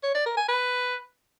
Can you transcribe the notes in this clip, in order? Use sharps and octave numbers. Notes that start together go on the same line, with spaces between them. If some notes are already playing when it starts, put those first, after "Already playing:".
C#5
D5
A#4
G#5
B4